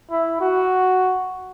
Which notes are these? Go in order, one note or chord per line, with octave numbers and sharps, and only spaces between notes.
E4
F#4